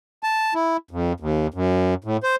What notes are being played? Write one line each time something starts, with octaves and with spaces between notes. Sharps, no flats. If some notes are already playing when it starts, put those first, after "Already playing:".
A5
E4
F2
D#2
F#2
A2
C5